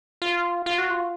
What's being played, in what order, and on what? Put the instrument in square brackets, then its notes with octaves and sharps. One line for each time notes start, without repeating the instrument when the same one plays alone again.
[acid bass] F4
F4
F#4
F4